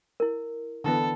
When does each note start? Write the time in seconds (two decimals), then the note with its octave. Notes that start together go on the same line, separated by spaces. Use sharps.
0.20 E4 A#4
0.84 D3 E3 B3 A4